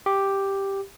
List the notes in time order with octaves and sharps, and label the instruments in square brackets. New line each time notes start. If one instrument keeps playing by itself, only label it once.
[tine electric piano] G4